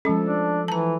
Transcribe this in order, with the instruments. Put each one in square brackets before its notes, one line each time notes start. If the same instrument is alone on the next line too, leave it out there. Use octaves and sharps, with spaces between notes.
[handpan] F3 A4 [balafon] G#3 C#4
[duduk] D4
[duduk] E3 [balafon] A5 A#5